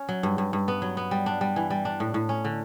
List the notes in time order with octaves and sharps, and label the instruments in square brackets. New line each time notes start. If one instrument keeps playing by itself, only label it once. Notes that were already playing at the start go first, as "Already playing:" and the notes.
Already playing: [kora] C#4
F#3
G2
G2
G2
B3
F#3
B3
G3
D4
G3
E3
G3
D4
A2
A2
C#4
D3